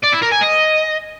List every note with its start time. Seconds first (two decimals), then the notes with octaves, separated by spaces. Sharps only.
0.04 D5
0.13 E4
0.23 A#4
0.32 G#5
0.42 D#5